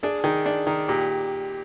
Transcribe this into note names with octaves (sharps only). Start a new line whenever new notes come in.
D4 G#4
D#3 G#4
D4
D#3
A#2 G4